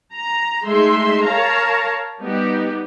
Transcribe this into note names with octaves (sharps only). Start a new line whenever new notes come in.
A#5
G#3 A3 D#4 E5 C6
A#4 C#5 F5 A5 A#5
G3 B3 D#4 G4